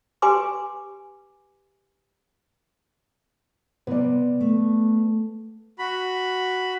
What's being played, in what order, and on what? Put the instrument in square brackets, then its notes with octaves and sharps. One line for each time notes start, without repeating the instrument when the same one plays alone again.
[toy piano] G4 B4 G#5 C6 D6
[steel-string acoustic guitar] C3 G3 [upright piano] B3 D5
[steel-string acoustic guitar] A3
[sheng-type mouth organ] F#4 B5